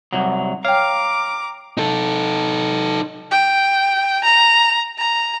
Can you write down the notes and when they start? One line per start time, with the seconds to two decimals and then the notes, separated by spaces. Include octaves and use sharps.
0.13 C2 F#3
0.65 C#5 F5 G5 A#5 D6
1.78 D#4 A4
3.31 G5
4.24 A#5
4.98 A#5